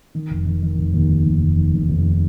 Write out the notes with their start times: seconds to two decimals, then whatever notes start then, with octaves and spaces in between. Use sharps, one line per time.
0.15 D#3
0.30 F1
0.46 D#3
0.62 D#3
0.78 F1
0.94 D#2
1.09 D#2
1.25 F1
1.41 F1
1.57 D#3
1.73 F1
1.88 F1